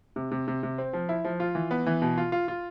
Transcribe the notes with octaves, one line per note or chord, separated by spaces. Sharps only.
C3
C3
C3
C3
C4
F3
E4
F3
F4
E3
B3
E3
B2
F4
F4
F4